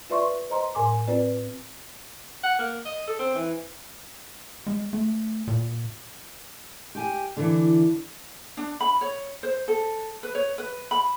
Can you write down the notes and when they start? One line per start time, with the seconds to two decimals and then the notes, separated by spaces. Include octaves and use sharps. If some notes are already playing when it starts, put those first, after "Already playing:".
0.10 F4 B4 D5 E5 C6 C#6
0.50 C5 D#5 A#5 C6
0.75 A2 A#4 G#5 C6 D6
1.08 C4 F4 B4 D5
2.43 F#5
2.59 A#3
2.85 D#5
3.07 A4
3.19 C4
3.35 E3
4.67 G#3
4.93 A3
5.48 A#2
6.95 G4 G#5
7.37 D3 E3
8.57 D4
8.80 B5
9.01 C#5
9.43 C5
9.68 A4
10.23 B4
10.35 C#5
10.58 B4
10.91 B5